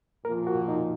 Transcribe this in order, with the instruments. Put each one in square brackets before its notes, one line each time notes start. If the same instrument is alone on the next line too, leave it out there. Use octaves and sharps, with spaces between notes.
[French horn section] A#2 F3 A#3 F4 [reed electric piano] A#4
[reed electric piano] F#4
D#4